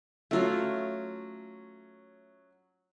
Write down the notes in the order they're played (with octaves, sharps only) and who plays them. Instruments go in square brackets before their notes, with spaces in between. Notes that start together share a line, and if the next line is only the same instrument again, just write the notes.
[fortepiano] F#3 C#4 E5 [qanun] A3 F4 F5